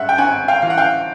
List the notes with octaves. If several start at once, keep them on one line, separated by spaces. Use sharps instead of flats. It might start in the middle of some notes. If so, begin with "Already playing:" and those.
Already playing: G2 G#3 E5 F#5
G5
G#1 F#5 G#5
F5 G5
E3 F5
F#5
F5 G5